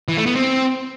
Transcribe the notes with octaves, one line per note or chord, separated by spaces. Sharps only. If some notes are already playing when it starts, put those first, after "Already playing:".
E3
A3
B3
C4